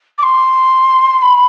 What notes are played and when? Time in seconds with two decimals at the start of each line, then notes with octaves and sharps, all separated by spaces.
0.18 D6
0.23 C6
1.22 B5